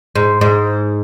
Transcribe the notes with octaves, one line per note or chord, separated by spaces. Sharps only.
G#2
G#2